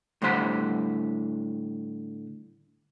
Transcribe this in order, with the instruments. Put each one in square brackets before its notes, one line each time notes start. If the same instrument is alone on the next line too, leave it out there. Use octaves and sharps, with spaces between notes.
[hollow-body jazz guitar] A2 D3 G3 C5 F#5 B5